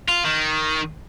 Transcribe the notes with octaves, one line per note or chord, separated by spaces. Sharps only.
F4
D#3